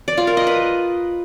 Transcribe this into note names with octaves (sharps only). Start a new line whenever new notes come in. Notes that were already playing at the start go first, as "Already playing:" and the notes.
D5
F4
A#4
D#5
B4